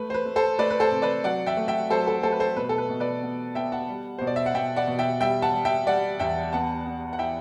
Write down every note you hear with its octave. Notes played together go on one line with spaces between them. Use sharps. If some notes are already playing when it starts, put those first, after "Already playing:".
Already playing: A3 B4
C5
B4
A3
A4 C5
A3 B4 D5
B4
A4 C5
C3
B4 D5
F#3 D5 F#5
E5 G5
A3
E5 G5
F#3 A4 C5
A4
A3 A4 C5
B4
A4 C5
B2 B4
A4
B4
B2
B4 D5
B3
B3 E5 G5
F#5 A5
G3
B2 C5
D5
E5
F#5
B2 E5 G5
D5 F#5
B2
E5 G5
G3 E5 G5
F#5 A5
G3
E5 G5
G3 D5 F#5
E2 E5 G5
B3 F#5 A5
B3
F#5
E3 E5 G5